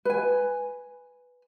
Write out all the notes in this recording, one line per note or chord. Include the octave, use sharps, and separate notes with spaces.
B4 G#5